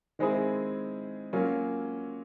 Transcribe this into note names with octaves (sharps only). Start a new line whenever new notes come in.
D#3 G#3 C4 E4 G#4
F#3 A#3 C#4 F4